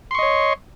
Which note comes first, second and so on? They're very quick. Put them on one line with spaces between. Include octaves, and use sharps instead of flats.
C6 C#6 D#5 C#5